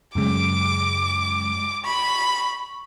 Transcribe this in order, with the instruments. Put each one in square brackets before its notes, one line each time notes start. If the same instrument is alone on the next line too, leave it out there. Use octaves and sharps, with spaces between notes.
[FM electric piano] F#2 C#3 G#3 [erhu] D6
[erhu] B5 [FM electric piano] C#6